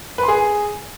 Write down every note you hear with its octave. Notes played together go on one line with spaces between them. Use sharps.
B4
C6
G#4